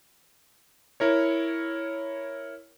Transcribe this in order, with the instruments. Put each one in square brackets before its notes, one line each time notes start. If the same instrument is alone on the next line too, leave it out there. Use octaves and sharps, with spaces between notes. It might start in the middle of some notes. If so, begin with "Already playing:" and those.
[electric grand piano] E4 A#4 C#5